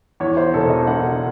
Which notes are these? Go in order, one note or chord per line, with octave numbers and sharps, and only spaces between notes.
E2 C#5
C5
E1 A4
D#5
E1 F#5